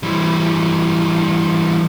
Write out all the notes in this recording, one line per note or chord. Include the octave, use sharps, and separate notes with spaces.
E3 G3